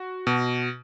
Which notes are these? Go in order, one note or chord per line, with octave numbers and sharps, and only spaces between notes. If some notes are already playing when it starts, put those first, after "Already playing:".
Already playing: F#4
B2